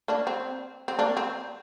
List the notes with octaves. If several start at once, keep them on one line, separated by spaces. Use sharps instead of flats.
A#3 D4
C4
C4
A#3 D4
C4